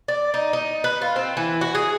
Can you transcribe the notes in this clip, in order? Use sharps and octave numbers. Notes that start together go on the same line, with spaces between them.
D5
D#4
D#4
B4
F4
C4
E3
F#4
G#4